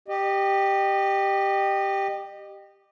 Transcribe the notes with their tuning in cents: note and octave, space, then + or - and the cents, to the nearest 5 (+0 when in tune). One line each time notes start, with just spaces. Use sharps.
G4 +0 D#5 -25